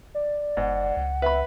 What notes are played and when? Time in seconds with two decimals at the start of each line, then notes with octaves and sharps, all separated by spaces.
0.15 D5
0.57 F#1 G#2 F#5
0.97 C#2
1.22 B4 E5 B5